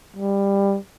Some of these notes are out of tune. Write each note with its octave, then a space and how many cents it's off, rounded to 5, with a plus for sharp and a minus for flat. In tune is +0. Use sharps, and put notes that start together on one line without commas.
G3 +15